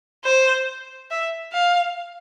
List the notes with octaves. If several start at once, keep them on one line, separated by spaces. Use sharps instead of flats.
C5
E5
F5